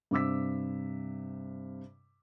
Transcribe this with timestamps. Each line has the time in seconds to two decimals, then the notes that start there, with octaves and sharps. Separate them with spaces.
0.11 G2 C3 D6 E6 B6